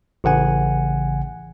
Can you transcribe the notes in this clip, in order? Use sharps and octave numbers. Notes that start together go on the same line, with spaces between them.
A1 C#3 F#5 G#5